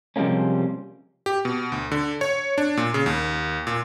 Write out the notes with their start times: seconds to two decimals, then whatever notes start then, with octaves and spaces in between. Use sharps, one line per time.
0.16 C3 F3 G3 G#3 A#3 C#4
1.26 G4
1.45 B2
1.72 D2
1.92 D3
2.21 C#5
2.58 D4
2.77 A#2
2.94 C#3
3.06 D#2
3.67 A#2